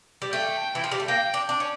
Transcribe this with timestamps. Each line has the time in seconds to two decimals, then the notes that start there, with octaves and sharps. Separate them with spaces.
0.22 G3
0.32 A3 G5
0.75 E3
0.84 F3
0.91 G3
1.00 A3
1.08 A#3 G5
1.34 D4
1.49 D4
1.60 C#4